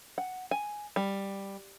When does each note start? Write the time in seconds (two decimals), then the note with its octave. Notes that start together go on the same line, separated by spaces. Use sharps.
0.18 F#5
0.51 G#5
0.96 G3